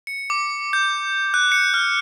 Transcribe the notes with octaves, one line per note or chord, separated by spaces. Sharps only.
C#7
D6
G6
F#6
C#7
F6